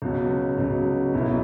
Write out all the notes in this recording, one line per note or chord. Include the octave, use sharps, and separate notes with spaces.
C#2 B2 F#3 C#4
C#2 B2 F#3 C#4
B1 B2 F#3 B3 E4